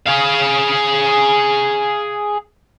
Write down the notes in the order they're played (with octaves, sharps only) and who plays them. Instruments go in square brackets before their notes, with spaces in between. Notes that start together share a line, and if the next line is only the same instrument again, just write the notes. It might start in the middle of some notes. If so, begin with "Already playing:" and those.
[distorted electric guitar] G#4 F5